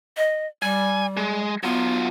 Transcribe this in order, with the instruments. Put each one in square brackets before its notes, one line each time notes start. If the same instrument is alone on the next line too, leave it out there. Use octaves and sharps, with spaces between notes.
[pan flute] D#5
[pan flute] G3 [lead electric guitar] G#5
[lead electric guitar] G#3
[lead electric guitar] F#3 F4 [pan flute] B3